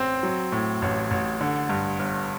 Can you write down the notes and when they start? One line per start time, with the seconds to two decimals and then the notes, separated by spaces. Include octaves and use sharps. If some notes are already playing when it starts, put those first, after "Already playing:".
Already playing: A1 C4
0.23 F#3
0.52 A2
0.82 A1
1.11 A1
1.41 D3
1.69 G2
1.99 G1